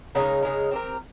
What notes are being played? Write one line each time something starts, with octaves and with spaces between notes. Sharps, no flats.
C#3 G#3 D#4 A#4
C#3 G#3 D#4 A#4
C4 G4 A#4